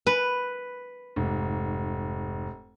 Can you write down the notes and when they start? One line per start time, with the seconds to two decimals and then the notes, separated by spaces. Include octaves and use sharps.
0.06 B4
1.16 F1 G#2